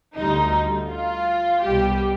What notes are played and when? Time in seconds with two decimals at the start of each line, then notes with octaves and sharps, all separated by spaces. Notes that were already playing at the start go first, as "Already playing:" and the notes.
0.17 D2 D3 G3 D#4
0.90 F4
1.64 C2 B2 G3 G4